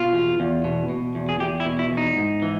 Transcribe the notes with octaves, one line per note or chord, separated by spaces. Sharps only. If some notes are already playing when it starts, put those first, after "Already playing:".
Already playing: B2 F4
E2
E2
B2
B2
E2
G#4
E2 G4
E4
B2
E4
E2
D#4
G#2
E3